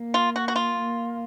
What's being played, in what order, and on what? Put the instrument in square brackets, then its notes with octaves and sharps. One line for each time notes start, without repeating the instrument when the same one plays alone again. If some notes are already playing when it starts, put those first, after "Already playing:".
Already playing: [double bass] A#3
[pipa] F4
F#4
F#4
F4
[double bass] A#3